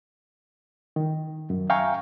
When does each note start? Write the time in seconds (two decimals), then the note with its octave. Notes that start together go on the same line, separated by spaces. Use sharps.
0.96 D#3
1.50 F#2
1.70 E5 F5 G5 G#5 A#5 C#6